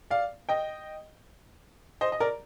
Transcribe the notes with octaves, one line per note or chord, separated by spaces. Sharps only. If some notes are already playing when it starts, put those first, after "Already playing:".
D5 F5
D#5 G5
C5 D#5
D#5
A#4 D5